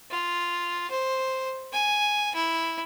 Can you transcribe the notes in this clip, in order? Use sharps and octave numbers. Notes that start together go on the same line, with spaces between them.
F4
C5
G#5
E4